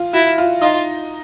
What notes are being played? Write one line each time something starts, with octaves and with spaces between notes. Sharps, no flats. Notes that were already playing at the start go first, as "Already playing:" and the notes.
Already playing: F4
E4 F#4
F4
D#4 F4